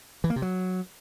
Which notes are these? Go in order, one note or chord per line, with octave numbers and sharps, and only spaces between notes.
E3
A#3
C3
F#3